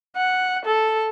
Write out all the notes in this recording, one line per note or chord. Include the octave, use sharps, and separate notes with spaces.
F#5
A4